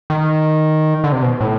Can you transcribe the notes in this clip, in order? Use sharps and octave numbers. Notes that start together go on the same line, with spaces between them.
D#3
D3
C3
B2
A2